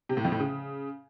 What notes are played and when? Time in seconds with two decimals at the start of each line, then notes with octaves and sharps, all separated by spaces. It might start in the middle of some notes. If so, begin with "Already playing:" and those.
0.09 C3
0.17 A2
0.25 F2
0.32 A2
0.40 C#3